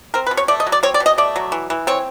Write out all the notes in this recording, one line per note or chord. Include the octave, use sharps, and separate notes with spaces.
C4 A#4
B4
B2
C#5
A3 D5
D#5
F#3
D5
C4 C#5
D5
B2
D#5
A3 D5
F#3
E3
E3
C4 C#5